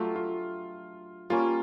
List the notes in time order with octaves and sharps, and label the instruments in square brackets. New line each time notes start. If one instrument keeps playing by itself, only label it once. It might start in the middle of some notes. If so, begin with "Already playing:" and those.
Already playing: [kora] F#3 A3 D4 G4 [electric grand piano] F4
[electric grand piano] F4
[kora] G3 A#3 C#4 [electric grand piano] F4